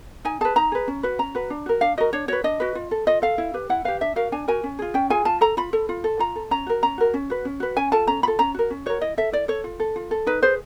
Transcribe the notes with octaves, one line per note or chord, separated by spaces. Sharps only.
D#4 G#5
G#4 B4 A5
D#4 A#5
G#4 B4
C#4
F#4 B4
C#4 A#5
F#4 B4
D4
F#4 A#4
D4 F5
F#4 A#4 D#5
D4 C#5
F#4 B4 C#5
D4 D#5
F#4 B4
F4
A4
F4 D#5
A4 F5
E4
G4 B4
E4 F#5
G4 B4 F5
D4 E5
F#4 A#4 F5
D4 G#5
F#4 A#4 G#5
C#4
F4 G#4
C#4 G5
F4 G#4 G#5
F4 A5
A4 A#5
F4 B5
A4
F4
A4
F4 A#5
A4
C#4 A#5
F#4 A#4
C#4 A#5
F#4 A#4
C#4
F#4 B4
C#4
F#4 B4
C#4 G#5
F4 A4 A5
C#4 A#5
F4 A4 B5
C#4 A#5
F#4 A#4
C#4
F#4 A#4 C#5
E4 D#5
A4 E5
E4 D5
A4 C#5
F4
A4
F4
A4
D#4 B4
G#4 B4 C5